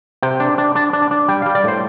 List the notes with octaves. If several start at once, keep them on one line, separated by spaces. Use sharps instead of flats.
C3 G5
D4
D4
D4 A5
D4
A5
D4
G3 G5
G3 F5
D5
A2 C5